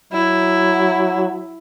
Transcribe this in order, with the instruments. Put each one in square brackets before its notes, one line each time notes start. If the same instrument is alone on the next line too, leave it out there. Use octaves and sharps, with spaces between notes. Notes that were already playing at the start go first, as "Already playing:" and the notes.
[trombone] F#3 [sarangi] E4